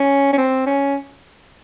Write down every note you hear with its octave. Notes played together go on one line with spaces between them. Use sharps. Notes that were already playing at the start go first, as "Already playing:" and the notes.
Already playing: C#4
C#4
C4
C#4